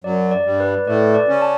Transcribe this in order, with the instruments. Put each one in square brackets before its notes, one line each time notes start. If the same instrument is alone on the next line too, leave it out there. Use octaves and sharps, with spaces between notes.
[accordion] F#2 F#3 [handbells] D5
[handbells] D5
[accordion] G2 G3
[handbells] B4
[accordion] A2 A3 [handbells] D5
[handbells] D5
[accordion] C#3 C#4
[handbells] A5